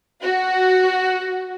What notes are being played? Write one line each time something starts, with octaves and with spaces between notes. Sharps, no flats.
F#4